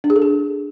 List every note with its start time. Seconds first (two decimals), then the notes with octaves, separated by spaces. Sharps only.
0.04 D4
0.10 G#4
0.16 A4
0.22 G#4